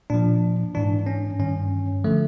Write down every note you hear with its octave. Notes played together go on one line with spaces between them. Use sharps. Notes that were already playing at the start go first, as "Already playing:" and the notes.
A#2 F3 D4
G#2 E3 D4
C#4
G2 D#3 C#4
D3 F3 A3